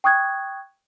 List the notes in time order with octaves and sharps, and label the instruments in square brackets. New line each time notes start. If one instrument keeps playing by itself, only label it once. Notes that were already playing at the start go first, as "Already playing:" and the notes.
[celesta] G5 C#6 D#6 F#6 G#6